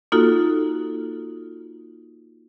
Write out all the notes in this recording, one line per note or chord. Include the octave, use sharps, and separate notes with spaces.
A#3 D#4 F4 F#4 A4